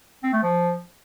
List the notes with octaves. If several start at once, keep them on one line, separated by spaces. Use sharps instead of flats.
C4
A3
F3